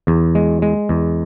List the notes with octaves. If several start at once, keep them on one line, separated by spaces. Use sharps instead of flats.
E2
G#3
G#3
E2